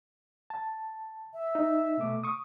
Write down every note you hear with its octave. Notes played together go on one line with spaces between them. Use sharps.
A5
E5
D#4
B2 A3 D6
C#6 D#6